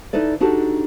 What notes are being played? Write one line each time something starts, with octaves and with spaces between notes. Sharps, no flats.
D#4 E4 A4 B4 D5
D4 D#4 F#4 G4 A4